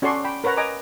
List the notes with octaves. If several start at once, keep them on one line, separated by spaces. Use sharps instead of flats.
C#4 F#4 A4 D5 C6 C#6
G5 B5
A#4 B4 C#5 F#5 A#5
D#5 G#5 A#5 D6